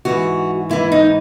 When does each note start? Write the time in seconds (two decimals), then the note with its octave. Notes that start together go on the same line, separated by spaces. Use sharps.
0.05 G#2 E3 F#4
0.69 G#2 E3 E4
0.92 D#4